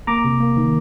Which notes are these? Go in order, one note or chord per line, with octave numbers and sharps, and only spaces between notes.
A#3 A#5 D6
C3
A#3
D#3